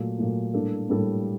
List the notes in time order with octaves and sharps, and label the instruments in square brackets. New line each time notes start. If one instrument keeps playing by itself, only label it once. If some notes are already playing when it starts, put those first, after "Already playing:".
Already playing: [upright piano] A#2 F#3 A3
A#2 F#3 A3
A2 G3 A#3 D4 A4
A2 G3 A#3 D4 A4